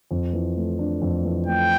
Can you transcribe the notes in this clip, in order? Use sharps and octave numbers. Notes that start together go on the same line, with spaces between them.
F2
E3
A3
D4
F2
E3
A3 G5